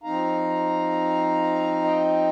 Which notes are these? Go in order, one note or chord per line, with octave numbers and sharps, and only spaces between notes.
F3 C4 D#4 F5 A#5
D#5 G5